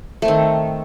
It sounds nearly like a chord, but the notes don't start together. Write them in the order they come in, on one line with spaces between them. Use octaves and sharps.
A3 C4 D#3